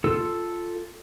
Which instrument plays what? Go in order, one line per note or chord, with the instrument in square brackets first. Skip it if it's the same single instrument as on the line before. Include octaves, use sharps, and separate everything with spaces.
[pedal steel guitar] F4 A4 E6